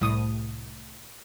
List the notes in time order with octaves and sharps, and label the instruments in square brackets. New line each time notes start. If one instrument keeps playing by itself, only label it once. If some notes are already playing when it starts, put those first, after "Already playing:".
[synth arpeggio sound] C2 A2 D#6